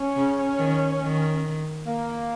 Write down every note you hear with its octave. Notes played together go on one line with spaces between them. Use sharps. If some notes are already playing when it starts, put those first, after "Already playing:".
Already playing: C#4
C#3
D#3
D#3
A#3